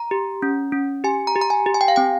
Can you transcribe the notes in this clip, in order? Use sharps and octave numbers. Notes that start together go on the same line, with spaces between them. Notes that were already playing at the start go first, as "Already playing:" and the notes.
Already playing: A#5
G4
C#4
C#4
G4 G#5
A#5
G4
A#5
G#5
G4
G#5
G5
F5
C4 G5